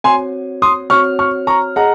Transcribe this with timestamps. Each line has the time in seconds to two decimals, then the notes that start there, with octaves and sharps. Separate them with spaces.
0.04 C4 F#4 C#5 G#5 C6
0.62 C6 D#6
0.90 C4 F#4 C#5 C#6 F6
1.19 C#6 F6
1.47 A#5 C#6
1.76 G#4 D#5 F#5 A#5